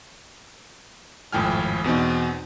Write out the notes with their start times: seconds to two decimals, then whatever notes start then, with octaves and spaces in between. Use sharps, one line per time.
1.33 G#1 F2 A2 G5 G#5 F6
1.84 E2 B2 C4 D#4